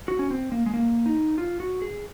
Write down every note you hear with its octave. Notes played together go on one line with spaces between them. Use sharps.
F#4
C#4
C4
A#3
G#3
A#3
D#4
F4
F#4
G#4